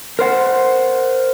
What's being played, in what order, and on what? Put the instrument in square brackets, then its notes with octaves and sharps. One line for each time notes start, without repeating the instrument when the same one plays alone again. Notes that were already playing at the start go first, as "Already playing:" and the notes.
[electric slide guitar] A#4 C5 F#5